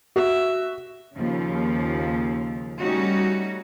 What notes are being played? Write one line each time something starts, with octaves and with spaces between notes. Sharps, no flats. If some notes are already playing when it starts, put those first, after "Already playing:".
F#4 E5
D#2 C#3 F3
G3 A3 C#4 D#4 F#4